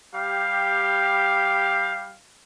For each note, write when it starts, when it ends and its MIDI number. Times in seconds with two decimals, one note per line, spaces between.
0.14 2.14 55
0.14 2.14 67
0.14 2.14 77